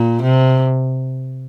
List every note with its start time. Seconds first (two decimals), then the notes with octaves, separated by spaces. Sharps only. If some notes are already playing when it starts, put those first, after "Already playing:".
Already playing: A#2
0.22 C3